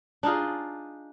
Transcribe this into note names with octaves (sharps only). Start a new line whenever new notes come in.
D4 D#4 F4 G#4